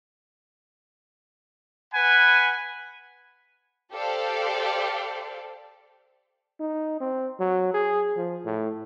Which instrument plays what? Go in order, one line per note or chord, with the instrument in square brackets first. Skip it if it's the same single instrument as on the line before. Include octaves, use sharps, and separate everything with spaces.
[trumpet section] B4 F#5 G#5 B5
[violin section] G4 A4 C5 D5 F5
[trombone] D#4
C4
F#3
G#4
F3
A2